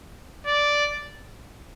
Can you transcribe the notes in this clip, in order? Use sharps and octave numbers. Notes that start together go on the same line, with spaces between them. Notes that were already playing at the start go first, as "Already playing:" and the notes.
D5